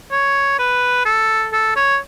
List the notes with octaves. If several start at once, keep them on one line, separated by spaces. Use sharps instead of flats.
C#5
B4
A4
A4
C#5